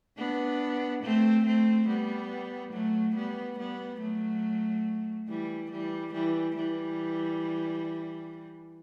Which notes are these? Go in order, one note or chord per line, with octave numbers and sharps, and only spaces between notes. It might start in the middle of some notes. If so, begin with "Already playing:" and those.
B3 D4
A3 C4
A3 C4
G3 B3
F#3 A3
G3 B3
G3 B3
F#3 A3
E3 G3
E3 G3
E3 G3
E3 G3